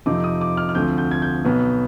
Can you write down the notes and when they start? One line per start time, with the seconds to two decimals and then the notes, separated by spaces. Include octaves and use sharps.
0.06 F2 C3 F3 C4 D#4 D6
0.24 D#6
0.41 D6
0.57 F6
0.69 F6
0.75 D2 D3 F3 C4 G6
0.98 G6
1.11 G#6
1.22 G6
1.44 B1 B2 B3